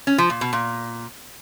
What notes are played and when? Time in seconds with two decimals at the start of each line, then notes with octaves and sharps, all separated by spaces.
0.07 C#4
0.18 F3
0.30 A#2
0.41 B2
0.53 A#2